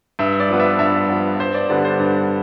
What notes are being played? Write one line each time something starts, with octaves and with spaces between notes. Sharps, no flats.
G2 E5
D5
F3 B3
E5
G2 E5
F3 B3 D5
G2 C5
D5
D3 G3 B3 D5
C5
G2 B4